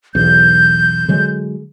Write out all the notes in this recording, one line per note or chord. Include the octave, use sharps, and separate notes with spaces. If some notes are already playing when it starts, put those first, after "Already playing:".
B1 E2 G6
D3 F#3 G#3